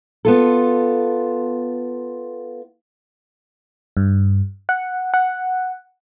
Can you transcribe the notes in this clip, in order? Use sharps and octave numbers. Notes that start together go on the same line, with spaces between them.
B3 F4 A4
G2
F#5
F#5